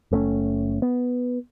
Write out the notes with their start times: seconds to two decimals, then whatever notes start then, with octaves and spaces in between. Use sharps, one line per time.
0.11 F#1 A3 C4 C#4
0.82 B3